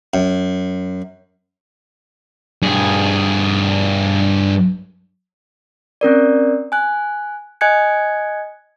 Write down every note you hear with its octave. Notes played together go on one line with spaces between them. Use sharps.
F#2
G2 G#4
C4 C#4 A#4 D5
G#5 F#6
D#5 G#5 F#6 G#6 C#7